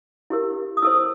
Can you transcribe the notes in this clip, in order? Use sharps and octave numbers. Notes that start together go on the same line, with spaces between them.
E4 G4 A#4
D#6
E4 A4 C5 E6